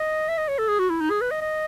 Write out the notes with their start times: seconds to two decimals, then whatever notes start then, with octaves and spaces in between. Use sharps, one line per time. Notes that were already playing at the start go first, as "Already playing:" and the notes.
Already playing: D#5
0.28 E5
0.37 D#5
0.48 C#5
0.58 A4
0.68 G#4
0.79 F#4
0.90 E4
1.00 D#4
1.10 G#4
1.21 B4
1.31 D#5
1.41 D#5